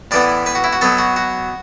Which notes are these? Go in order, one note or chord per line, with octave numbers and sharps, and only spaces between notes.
A2 E3 B3 D5
B4
F#4
E4
F#4
B2 F#3 B3 A4
F#4
F#4